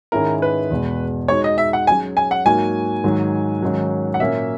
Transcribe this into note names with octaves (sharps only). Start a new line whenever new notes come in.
G#2 D#3 G#3 C#4 E4 A#4
B4
E2 B2 G#3
G#3 D#4 F#4 C#5
D#5
E5
F#5
F#3 C#4 G#4 G#5
G#5
F#5
G#2 F#3 A#3 D#4 F#4 G#5
G#2 D#3 F#3
G#2 D#3 F#3 C#4
F#5
A#2 F#3 A#3 C#4 E5